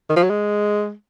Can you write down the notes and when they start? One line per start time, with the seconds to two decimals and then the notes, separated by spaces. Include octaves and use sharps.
0.09 D#3
0.16 F3
0.23 F#3
0.30 G#3